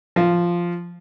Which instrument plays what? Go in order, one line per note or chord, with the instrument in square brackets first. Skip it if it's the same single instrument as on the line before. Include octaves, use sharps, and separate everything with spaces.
[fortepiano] F3